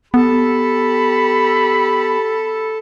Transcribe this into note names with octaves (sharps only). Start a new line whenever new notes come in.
B3 G4 A4 B5